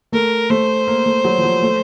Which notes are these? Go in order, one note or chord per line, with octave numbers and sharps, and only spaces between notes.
A3 A#4
A3 C5
A#3
A3
F#3
F3
F#3
A3